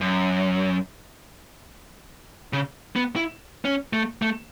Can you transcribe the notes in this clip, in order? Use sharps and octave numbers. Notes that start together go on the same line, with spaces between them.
F#2
C#3
B3
E4
C#4
A3
A3